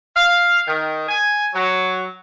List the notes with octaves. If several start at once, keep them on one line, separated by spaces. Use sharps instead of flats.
F5
D#3
G#5
F#3